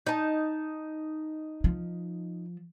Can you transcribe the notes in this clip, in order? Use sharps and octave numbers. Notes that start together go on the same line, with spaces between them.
D#4 A5
F3